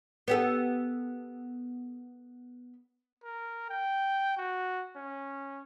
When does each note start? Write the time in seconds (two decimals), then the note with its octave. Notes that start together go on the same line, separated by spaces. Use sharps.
0.28 B3 G4 A4
3.24 A#4
3.69 G5
4.37 F#4
4.96 C#4